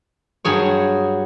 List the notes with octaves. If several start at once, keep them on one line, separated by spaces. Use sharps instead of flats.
G2 F#3 G#4 C#5